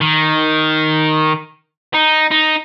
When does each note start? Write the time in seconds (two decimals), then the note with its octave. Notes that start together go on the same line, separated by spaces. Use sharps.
0.01 D#3
1.94 D#4
2.32 D#4